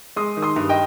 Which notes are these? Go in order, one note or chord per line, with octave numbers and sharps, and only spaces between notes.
G#3 C6 D#6
D#3
C6 D#6
G2
D#5 G5